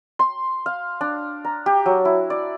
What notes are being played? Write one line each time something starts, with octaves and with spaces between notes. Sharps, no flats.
C6
F5
D4
A#5
G4
F#3
E4
D5